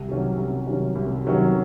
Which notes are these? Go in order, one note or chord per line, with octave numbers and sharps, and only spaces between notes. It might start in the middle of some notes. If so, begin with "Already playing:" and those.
Already playing: C2
C3 D#3 F#3 C#4
C2
C3 D#3 F#3 C#4
C2
C3 D#3 F#3 C#4